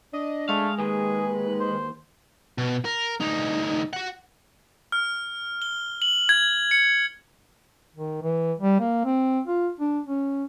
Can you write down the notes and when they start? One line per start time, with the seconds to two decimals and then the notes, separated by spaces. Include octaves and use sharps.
0.13 D4 D#5
0.49 G#3 A3 F5
0.79 D#2 D#3 G#4 B4
1.60 C5
2.58 B2
2.85 A#4
3.20 D2 D#4
3.93 F#4 F#5
4.92 F6
5.62 G7
6.02 F#7
6.29 G#6
6.71 C#7
7.96 D#3
8.23 E3
8.60 G3
8.80 A#3
9.05 C4
9.48 F4
9.80 D4
10.07 C#4